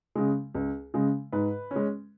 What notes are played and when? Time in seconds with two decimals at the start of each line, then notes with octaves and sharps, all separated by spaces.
0.15 C#3 G#3
0.55 C#2
0.94 C#3 G#3
1.32 G#2 B4
1.71 C#4
1.76 G#3